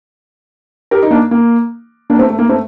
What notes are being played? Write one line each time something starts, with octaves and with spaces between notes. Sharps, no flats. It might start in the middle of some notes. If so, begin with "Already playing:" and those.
G4 A#4
D#4
A#3 D4
A#3
A#3 D4
A3 C4
A3
A#3
A3 C4